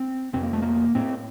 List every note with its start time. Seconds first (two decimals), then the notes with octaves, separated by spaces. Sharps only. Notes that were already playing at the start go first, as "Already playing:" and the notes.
Already playing: C4
0.33 F2 C3 C4
0.43 A#3
0.53 A3
0.62 A#3
0.95 A2 C4